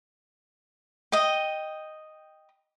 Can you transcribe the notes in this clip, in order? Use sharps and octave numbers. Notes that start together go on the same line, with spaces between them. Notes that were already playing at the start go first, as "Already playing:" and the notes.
D#5 G5